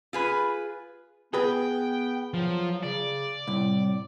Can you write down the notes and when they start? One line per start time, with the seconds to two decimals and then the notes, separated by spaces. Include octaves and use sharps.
0.13 F4 G#4 B4
1.34 B3 G#4 B4 G5
2.34 F3 F#3
2.83 C#3 D5
3.47 C2 A2